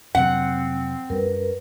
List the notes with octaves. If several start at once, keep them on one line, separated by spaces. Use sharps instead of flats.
F2 C3 F#3 C4 F#5
F#2 G3 A#4 B4